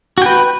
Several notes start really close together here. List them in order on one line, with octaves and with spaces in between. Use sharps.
F#4 G5 B4